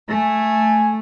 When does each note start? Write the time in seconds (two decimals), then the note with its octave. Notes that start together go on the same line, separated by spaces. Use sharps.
0.11 A3 G#5